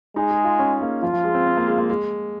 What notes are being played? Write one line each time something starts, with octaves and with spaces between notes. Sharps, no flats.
G#3 D#4
G#4
F4
C#4
A#3
F3 F4
F3
G#3
C4
C4
A#3
G#3
A#3
G#3